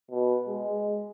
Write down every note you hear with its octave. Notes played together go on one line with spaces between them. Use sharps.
B2
G#3